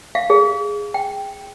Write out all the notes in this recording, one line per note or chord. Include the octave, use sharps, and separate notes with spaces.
F5
G#4
G5